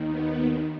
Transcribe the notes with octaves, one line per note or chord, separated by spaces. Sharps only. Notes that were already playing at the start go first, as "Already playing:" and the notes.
Already playing: D#2 D#3
B3